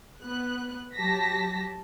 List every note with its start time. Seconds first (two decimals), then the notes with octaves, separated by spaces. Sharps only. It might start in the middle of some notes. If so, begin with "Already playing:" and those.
0.22 B3 F#6
0.95 F#3 G4 A5 A#6 B6